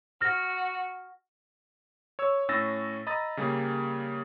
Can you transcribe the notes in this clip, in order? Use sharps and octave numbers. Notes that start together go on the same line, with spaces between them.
F#4 F6 A#6
C#5 E6
A2 C#4 E6 A6 A#6
D#5 A#5 B5 D#6 A6
C#3 G3 A#3 G#4